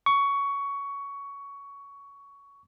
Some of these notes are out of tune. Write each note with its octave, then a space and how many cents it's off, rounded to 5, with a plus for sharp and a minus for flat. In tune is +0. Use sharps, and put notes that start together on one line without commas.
C#6 +15